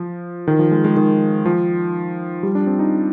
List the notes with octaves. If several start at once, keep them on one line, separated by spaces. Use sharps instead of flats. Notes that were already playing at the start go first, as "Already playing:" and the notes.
Already playing: F3
D#3
F3
G#3
G#3
D#3
F3
G3
D4
C4
D#4